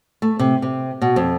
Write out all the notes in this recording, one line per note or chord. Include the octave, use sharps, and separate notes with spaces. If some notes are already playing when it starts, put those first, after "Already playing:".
A3
C3
C3
B2
F2